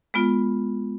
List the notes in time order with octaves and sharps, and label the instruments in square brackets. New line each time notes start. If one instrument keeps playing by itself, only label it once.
[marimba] G#3 B3 F4